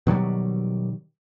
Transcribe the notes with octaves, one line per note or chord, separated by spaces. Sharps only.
B2 D#3 F#3 G3